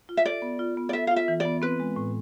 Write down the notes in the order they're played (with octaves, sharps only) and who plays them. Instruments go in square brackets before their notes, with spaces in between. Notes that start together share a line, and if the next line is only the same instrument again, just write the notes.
[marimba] F4
[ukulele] E5
[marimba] A4 [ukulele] D5
[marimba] B3
F4
B3
[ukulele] D5
[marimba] A4 [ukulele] E5
[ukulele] F5
[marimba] F4
[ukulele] E5
[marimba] E3
[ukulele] D5
[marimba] B3
[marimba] C4 [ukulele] B4
[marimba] G#3
A2